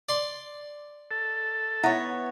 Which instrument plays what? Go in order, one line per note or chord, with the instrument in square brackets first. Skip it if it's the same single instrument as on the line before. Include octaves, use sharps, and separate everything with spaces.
[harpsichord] D5 C6
[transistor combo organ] A4
[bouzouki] B3 C#5 [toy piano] E4 E5